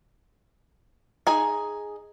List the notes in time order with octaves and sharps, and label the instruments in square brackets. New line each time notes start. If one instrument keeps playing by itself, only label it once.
[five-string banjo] D#4 G#4 G#5